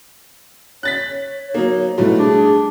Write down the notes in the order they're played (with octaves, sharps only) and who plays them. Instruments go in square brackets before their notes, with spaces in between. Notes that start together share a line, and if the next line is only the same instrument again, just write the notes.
[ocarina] C#5 [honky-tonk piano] F#6 A6 B6
[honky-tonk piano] F#3 A#3 [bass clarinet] D#4
[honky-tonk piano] B2 G3 A3 [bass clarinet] F#3 [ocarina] E4
[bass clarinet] D4 [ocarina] G#4